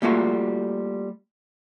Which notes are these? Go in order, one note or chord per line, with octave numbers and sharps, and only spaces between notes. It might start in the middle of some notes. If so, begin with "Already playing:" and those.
G3 A3 A#3 F4 F#4